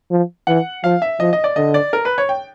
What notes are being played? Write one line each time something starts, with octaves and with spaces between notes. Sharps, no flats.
F3
E3 F#5
F3 F5
E5
F3 D#5
D#5
D5
D3 D#5
D5
A#4
B4
C#5
G5